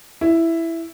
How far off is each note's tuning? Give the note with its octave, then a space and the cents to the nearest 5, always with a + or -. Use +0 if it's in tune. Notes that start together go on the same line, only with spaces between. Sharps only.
E4 +5